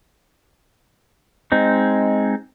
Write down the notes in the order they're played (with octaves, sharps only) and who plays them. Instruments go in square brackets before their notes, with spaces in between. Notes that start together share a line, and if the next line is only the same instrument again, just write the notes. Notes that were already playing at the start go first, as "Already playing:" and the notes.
[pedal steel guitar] G#3 C4 D#4